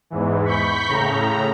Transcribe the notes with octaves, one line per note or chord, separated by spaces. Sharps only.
E2 G#2 E3
B5 C#6 G6 B6
A2 C#3 A#5